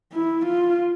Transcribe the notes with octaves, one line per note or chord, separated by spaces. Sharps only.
E4
F4